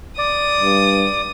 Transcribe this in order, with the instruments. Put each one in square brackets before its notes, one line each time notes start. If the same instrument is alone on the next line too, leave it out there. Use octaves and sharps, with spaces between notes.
[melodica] D5 [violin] D#6
[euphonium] G2